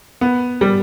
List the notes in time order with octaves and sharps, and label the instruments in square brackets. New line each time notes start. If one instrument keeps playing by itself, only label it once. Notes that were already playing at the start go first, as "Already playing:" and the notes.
[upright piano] B3
G3